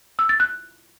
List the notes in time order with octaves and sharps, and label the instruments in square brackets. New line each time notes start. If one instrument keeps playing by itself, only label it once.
[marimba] E6
A6
F#6